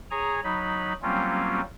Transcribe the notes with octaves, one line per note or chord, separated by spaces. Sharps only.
G#4 C#5 G#5 A#5
F#3 D#4 B5
F#3 G3 A#3 C4 C#4 F4